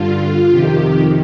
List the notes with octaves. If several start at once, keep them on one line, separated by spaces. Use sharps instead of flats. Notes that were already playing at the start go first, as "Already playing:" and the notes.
Already playing: G2 D3 F4
F2 C3 D#3 G4